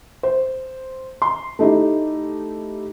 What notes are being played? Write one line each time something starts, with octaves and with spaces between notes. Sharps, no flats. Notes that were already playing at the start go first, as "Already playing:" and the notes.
C5
C6
A3 D#4 E4 G4